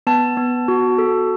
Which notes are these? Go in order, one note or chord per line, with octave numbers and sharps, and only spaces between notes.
B3 A5
B3
F#4
A4